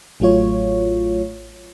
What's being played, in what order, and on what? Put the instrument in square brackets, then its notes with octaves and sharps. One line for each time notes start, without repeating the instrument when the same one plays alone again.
[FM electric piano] A1 F#3 A3 F4 C#5